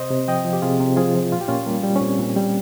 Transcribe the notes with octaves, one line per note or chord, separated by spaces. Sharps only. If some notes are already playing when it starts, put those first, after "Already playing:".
Already playing: C3 C5 D#5
C3
F3 D#5 G5
F3
G4
C3 F4 G#4
C3
F3 F4 G#4
F3
A#2 F4
G4
A#2 C#4 F4
G3 A#3
G3
C#4
A#2 C4
A#2
G3